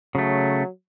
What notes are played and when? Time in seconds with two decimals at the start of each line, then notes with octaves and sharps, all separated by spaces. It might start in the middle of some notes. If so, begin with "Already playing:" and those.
0.15 C#3 F#3 A3